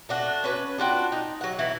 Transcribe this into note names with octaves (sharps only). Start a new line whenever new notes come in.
A3 D4 F#4
C#4 B4
D4 F4 F#4 G5
D#4
F#3 F#5
E3 F#3 D#4 E4